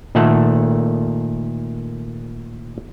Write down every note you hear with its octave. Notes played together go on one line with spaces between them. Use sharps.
A#2 D#3 A3 A4 F#5